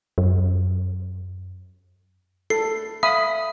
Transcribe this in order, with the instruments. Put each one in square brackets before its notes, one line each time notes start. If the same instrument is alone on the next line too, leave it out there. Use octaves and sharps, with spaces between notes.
[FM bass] F#2
[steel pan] A4 [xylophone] C7
[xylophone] E5 [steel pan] F5 B5 D#6